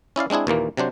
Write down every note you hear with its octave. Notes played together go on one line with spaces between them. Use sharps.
C#4 E4 D5 F5
G#3 C4 D4 E4 G#4
D#2 A#2 E3 A#3
C3 F#3 D4 C5